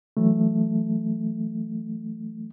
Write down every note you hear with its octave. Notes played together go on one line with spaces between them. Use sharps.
E3 F#3 A3